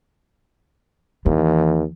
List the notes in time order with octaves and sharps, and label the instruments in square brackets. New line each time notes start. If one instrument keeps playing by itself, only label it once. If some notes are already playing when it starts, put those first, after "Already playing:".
[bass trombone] D#2 [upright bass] E3